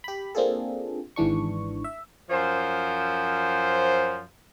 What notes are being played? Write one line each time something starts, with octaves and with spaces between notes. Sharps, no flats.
G4 B5
A#3 C4 D4 F4 G#4 A4
G#1 G#2 E3 D4 C#6
E5
F#2 F3 C5